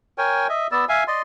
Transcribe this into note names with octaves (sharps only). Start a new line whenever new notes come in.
A#4 C#5 G5 G#5
D#5 E5
B3 D5 E6
E5 F5 G#5
D5 D#5 C6